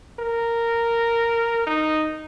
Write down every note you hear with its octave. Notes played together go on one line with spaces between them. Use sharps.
A#4
D#4